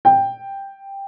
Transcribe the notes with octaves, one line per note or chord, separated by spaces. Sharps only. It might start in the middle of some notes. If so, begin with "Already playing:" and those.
G5